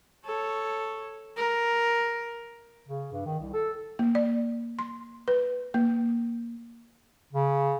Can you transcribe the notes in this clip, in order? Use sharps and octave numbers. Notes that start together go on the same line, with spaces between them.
A4 C#5
A#4
C#3
G2
D#3
C2
A4
A#3
D5
C6
B4
A#3
C#3